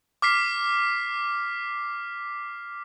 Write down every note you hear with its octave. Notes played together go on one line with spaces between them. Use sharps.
D6 F6 B6 C7